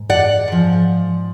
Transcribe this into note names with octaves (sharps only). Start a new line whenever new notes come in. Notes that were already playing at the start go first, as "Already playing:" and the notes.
Already playing: G#2
D5 F#5
G#2 F3